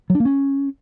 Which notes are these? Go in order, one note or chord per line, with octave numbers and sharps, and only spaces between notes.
F#3
D4
A#3
C#4